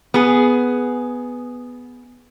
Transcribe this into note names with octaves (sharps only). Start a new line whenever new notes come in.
B3 G#4